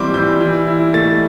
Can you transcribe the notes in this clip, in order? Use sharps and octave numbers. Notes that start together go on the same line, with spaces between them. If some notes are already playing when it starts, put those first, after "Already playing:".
Already playing: E3 G3 C4 C6 D6
E3 G6
E3
E4
A3 A6